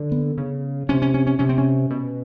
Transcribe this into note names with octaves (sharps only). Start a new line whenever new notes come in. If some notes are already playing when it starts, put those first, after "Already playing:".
Already playing: D3
B3
C#3
C3 C#4
C#4
C#4
C#4
C3 C#4
C4
C#4
B2